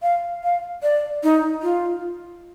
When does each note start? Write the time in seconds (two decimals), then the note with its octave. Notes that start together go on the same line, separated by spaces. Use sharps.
0.02 F5
0.43 F5
0.83 D5
1.23 D#4
1.63 F4